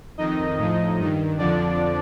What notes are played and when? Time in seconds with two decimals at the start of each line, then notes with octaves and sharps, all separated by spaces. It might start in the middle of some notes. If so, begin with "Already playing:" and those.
0.18 F2 D#3 D#4 D#5
0.58 A2 F3
0.98 G2 D#3
1.38 F2 D3 F3 D4 D5